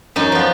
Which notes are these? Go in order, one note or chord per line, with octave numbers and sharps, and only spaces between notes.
F#2 D#4
F3 B3